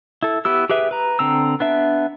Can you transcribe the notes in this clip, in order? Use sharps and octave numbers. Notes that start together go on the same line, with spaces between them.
E4 A4
B3 E4 G4 E6
G4 G#4 B4 E5
B4 A#5
D3 C4 A#5 E6
B3 D4 E5